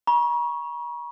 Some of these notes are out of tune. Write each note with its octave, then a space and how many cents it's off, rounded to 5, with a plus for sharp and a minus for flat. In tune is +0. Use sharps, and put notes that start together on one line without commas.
A#5 +45 C#6 +0